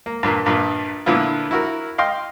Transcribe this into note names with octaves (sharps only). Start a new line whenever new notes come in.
A#3
G2 A#2 A#3
A#1 G2 A#2
A#2 D3 B3 E4 F4
E4 F#4 A#4
D#5 F5 G5 C6